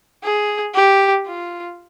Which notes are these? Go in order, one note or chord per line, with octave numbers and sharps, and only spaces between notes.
G#4
G4
F4